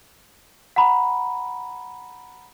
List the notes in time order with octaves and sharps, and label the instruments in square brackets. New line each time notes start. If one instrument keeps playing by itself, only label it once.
[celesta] F#5 A#5 B5